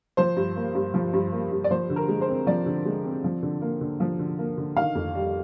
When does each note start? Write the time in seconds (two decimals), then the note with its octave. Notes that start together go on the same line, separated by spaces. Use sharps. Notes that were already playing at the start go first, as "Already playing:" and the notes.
0.17 F3 C5
0.36 G2
0.56 A#3
0.75 G2
0.94 F3
1.13 G2
1.32 A#3
1.52 G2
1.64 D5
1.70 F3 C5
1.90 D3
1.96 A#4
2.08 G#3
2.21 C5
2.28 C4
2.47 F3 D5
2.66 D3
2.85 G#3
3.04 C4
3.24 F3
3.43 D3
3.62 A#3
3.81 D3
4.00 F3
4.19 D3
4.39 A#3
4.58 D3
4.77 D#3 F5
4.95 F2
5.15 G3